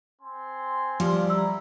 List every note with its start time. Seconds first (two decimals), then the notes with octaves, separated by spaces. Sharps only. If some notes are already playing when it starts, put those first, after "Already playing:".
0.21 C4 G#5 C6
1.00 F3 G3 F4
1.30 E4 A#5 E6